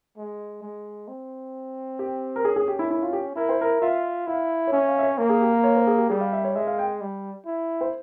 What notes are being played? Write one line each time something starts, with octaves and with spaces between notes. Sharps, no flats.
G#3
G#3
C4
G4
A#4
C#4 G#4
G#4
G4
E4
E4
F4
G4
E4 A#4
C5
A#4
F4 E5
E4 F5
C#5
C#4 E5
F5
E5
C#5
A#3 A#4
G#4
G4
A#4
C#5
C5
G#4
G4
G3 G#4
F5
E5
C#5
G#3 E5
F5
G5
G3
E4
C5